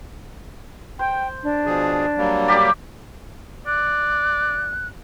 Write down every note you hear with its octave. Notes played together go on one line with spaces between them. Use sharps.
C5 G5
D4
B2 F3 G#4
F#3 G3 A#3
G4 A#4 D5
D5 F#6